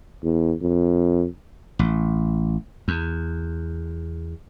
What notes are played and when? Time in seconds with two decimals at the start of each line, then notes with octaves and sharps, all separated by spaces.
0.23 E2
0.62 F2
1.79 A1
2.88 E2